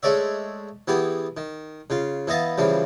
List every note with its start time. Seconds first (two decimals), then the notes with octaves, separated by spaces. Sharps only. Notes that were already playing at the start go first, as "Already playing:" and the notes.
0.03 G#3 A3 C#5 D5 E5
0.88 E3 B3 G4 G#4
1.37 D#3
1.90 C#3 F4
2.27 E3 B3 D#5 F5 A5
2.58 C#3 E3 F3 G3